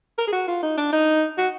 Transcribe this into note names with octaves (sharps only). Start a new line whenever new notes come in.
A#4
G#4
F#4
F4
D#4
D4
D#4
F#4